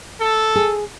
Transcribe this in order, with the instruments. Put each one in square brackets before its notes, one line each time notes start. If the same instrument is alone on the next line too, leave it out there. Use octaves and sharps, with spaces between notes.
[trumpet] A4
[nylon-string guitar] G#4